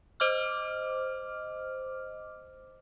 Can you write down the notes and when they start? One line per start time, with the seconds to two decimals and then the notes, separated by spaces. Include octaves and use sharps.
0.20 C5 D#5 D6 F6